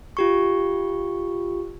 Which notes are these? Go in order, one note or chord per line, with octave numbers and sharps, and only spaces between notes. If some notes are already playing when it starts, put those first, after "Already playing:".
F4 G4 C#6